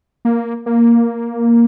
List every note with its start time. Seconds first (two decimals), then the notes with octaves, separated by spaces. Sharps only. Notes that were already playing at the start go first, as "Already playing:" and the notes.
0.25 A#3
0.66 A#3